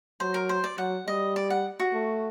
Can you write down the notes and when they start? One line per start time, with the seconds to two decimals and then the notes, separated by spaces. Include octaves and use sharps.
0.20 F#3 C5
0.34 A#4
0.49 C5
0.64 D5
0.78 F#3 F#5
1.07 G3 D#5
1.36 D5
1.50 F#5
1.80 F#4
1.94 A3